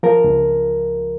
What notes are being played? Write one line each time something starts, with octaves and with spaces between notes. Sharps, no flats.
F3 A#4
C#2